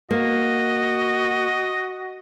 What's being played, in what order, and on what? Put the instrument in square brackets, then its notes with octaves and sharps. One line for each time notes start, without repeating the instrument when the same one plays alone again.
[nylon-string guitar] A#3 [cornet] F#4 [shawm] D#5